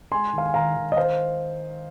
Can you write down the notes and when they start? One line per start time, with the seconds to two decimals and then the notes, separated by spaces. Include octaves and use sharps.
0.12 G#3 G#5 C6
0.33 D#3
0.38 F5
0.46 G#5
0.54 D#3 F5 A#5
0.76 D#3
0.92 D#5
0.97 C5 F5